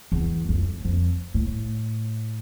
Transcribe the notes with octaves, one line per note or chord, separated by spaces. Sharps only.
E2
F2
F2
A2